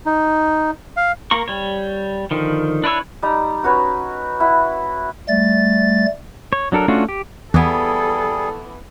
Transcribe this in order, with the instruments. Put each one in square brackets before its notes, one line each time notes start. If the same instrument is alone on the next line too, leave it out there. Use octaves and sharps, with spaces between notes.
[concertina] D#4
F5
[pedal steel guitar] A#3 A#4 C#6
G3 C#5
D3 D#3 F3
D4 E4 B4 C#5 E6
[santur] G3 D#4 A#5
C#4 F#4 B4 C#5
E4 F#5
[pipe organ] G3 A3 A6
[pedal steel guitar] C#5
F#3 D4 A4 A#4
A3 C#4 D4 F4 F#4
G4
[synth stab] E2 [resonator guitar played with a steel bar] E3 B3 [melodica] G3 G#4 [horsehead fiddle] A4